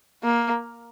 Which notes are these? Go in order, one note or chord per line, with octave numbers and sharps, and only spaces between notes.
A#3